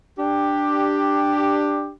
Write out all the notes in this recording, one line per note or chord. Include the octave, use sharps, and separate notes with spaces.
D4 G4